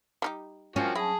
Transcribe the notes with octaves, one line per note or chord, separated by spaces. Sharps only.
G3 D#4 G4
F3 A#3 C#4 F#4 G5
F#3 E4 G#4 A5